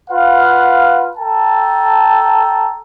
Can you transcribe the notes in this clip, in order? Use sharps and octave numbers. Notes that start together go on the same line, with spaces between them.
F4 B4 F5 F#5
A4 G5 A5 A#5